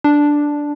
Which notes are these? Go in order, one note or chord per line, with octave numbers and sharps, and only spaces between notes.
D4